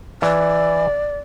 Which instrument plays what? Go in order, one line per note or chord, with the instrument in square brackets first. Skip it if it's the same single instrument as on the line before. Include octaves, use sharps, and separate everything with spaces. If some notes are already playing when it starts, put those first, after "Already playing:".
[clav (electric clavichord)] E3 [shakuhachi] D5